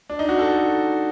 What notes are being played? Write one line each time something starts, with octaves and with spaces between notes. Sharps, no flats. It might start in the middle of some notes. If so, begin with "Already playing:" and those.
D4
D#4
F#4
A4